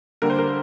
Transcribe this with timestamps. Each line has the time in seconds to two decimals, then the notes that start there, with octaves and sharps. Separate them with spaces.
0.22 D3 G3 A#3 A#4
0.30 C5
0.39 A#4